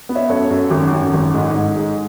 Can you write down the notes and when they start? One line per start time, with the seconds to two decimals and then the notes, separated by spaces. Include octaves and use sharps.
0.09 B3
0.15 C#5 E5
0.29 F#2 A4 C#5
0.50 F#2
0.71 G#1
0.92 F#2
1.14 G#1
1.34 G#2
1.55 G#2
1.76 G#3